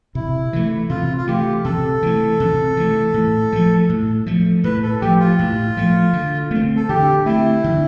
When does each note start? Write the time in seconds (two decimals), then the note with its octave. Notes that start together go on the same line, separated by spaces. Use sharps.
0.15 C3 E4
0.53 E3 A3
0.90 C3 F4
1.17 F4
1.28 E3 A3 G4
1.64 C3 A4
2.03 E3 A3
2.40 C3
2.77 E3 A3
3.14 A2
3.52 F3 A3
3.89 A2
4.26 F3 A3
4.64 A2 B4
4.83 A4
5.01 F3 A3 G4
5.20 F4
5.39 A2
5.77 F3 A3
6.13 D3
6.51 A3 C4
6.76 A4
6.89 D3 G4
7.25 A3 C4 E4
7.64 D3